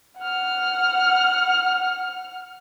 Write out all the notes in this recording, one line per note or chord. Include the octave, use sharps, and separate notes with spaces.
F#5 F6